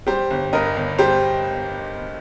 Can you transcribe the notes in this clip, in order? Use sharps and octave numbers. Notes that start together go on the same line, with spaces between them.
G3 G4 C5
G1
G2 A#4 D#5
G1
G3 G4 C5